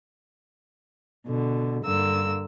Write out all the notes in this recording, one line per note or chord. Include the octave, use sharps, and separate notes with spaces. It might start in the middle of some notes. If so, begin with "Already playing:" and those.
B2 D3
G2 D3 A#3 E6